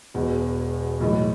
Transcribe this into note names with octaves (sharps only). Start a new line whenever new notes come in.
E1 E2 B2
B1 A2 E3 G#3